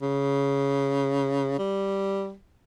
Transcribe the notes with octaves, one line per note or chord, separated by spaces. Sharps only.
C#3
G3